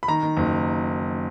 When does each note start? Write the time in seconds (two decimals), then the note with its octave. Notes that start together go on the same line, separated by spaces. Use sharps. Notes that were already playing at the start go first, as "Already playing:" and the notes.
0.03 B5
0.08 D#3 A#5
0.23 D#3
0.37 F#1